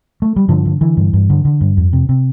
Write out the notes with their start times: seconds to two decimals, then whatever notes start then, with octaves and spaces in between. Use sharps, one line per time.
0.22 A3
0.36 G3
0.48 G2 D3 F3
0.66 D3
0.81 D3 E3
0.97 G2
1.13 G2
1.30 D3
1.45 D3
1.61 G2
1.77 F2
1.93 C3
2.09 C3